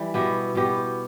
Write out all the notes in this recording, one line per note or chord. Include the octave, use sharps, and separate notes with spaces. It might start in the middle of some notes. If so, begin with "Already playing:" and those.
Already playing: E3 G3
B2 B3 E4 G4
B2 B3 G4